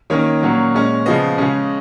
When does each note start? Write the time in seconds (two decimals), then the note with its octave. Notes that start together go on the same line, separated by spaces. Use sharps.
0.10 D#3 A#3 C#4 C#5
0.42 A#2 F#3 A#3 C#4
0.74 A#2 G#3 C#4
1.06 C#3 F3 B3 D#5
1.38 C#3 G#3 C#4